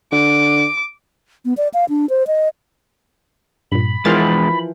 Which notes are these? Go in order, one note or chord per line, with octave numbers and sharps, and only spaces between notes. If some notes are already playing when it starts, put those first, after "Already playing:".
D3 D6
B3
D5
F5
D4
C5
D#5
G2 A#2 B5
E2 E3 F3 G#3 A#4 C6 F6 A6